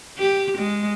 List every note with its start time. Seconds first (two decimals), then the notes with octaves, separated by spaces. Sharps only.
0.18 G4
0.58 G#3